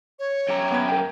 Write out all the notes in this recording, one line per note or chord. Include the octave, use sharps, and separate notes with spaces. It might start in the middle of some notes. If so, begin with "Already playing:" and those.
C#5
F#2 G4 A#5
B3 G#6
A#4 G5